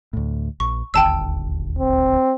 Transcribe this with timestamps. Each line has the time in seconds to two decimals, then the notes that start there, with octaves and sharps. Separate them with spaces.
0.13 D2 A2
0.60 A#1 C#6
0.94 D#1 G#1 D2 G5 A5 E6
1.79 C4